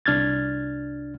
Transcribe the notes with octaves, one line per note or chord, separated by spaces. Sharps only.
C2 D4 F6 G#6 A6